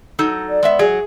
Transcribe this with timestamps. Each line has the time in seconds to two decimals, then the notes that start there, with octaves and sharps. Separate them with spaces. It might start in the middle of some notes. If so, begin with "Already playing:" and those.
0.19 F#3 D#4 A4
0.49 D5
0.63 G#3 B3 E5
0.79 F#3 G#4